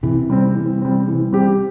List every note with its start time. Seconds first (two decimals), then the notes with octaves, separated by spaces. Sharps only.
0.03 C3 E3
0.30 G3 C4
0.55 E3
0.82 G3 C4
1.08 E3
1.33 G3 C4 G4